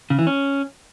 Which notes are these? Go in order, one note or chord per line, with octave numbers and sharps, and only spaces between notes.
C#3
E3
C#4